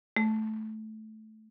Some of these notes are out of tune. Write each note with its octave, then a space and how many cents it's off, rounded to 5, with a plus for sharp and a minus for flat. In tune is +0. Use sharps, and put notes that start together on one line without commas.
A3 -15